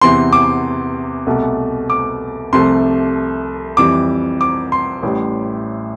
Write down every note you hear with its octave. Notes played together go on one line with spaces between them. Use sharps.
E2 C3 E3 C6
D6
C2 B2 A3
D6
C2 C3 F3 A3 C6
F2 E3 G3 D6
D6
C6
A1 A2 G3